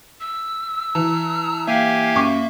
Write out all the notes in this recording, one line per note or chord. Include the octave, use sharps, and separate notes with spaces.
E6
E3 A5 A#5
A#3 G4 E5 F5 G#5
F#2 C#6 D6